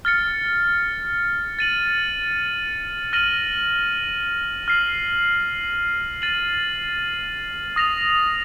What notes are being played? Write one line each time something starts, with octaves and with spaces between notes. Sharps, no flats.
F6 A6 C#7
A6 D#7 F#7
F6 A#6 D#7 F#7
F6 C7 F#7
A6 D#7 F#7
D#6 A#6 F7